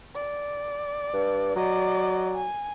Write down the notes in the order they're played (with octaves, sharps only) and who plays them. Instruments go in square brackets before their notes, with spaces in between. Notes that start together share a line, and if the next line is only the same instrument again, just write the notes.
[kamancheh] D5
[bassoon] G2
[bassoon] F#3 [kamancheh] D5 D#5
[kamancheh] G#5